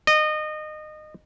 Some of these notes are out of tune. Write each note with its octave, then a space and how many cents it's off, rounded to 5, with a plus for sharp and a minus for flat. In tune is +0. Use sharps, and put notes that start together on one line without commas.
D#5 -25